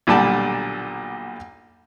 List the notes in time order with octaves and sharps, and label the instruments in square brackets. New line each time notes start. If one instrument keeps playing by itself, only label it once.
[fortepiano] B1 A#2 D3 G3 D5 A5